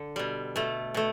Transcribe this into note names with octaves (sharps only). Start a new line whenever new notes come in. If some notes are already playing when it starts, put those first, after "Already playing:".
Already playing: D3
B2 G3
B2 A3
B2 A3